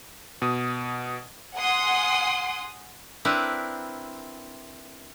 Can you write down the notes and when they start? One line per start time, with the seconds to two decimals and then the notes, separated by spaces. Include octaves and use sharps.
0.42 B2 D#6
1.54 F#5 G#5 C6 D#6
3.25 C4 D4 E4 A#4 B4